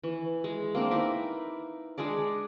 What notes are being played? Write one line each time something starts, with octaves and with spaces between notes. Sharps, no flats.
E3
G#3
A#3 C4 D4
D#4 E4 A#4 B4
G#3 D4 G#4 D5